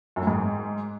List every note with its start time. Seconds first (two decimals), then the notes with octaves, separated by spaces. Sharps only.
0.16 F#2
0.22 A2
0.27 G#2